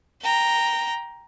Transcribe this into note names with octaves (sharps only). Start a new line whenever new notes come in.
G5 A#5